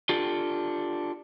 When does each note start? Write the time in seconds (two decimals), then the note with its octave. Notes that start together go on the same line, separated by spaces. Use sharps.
0.09 D4 F4 G4 A4